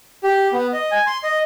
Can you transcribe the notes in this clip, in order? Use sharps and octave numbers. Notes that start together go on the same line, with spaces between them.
G4
B3
D#5
G#5
C6
D#5